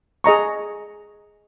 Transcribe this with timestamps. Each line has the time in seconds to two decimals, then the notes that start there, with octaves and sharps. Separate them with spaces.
0.24 G#4 D#5 A#5 C#6